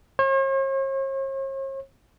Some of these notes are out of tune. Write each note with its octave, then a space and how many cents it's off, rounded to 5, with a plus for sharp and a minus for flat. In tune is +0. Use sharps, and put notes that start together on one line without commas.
C#5 -45